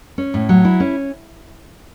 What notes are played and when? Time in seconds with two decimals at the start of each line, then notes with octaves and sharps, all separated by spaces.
0.18 C#4
0.34 A2
0.49 F#3
0.65 E4
0.80 C#4